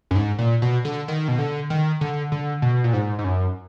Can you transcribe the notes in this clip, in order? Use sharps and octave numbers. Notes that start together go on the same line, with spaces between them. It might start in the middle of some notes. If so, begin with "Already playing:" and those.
F#2
G#2
A#2
B2
D3
D#3
B2
D3
D#3
D3
D3
B2
A#2
G#2
G#2
F#2